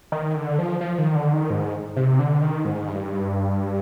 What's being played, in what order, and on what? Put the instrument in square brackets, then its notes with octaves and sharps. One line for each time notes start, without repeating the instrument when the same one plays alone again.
[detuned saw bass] D#3
D3
F3
F3
D#3
D3
D#3
G#2
C3
D3
D#3
G#2
G2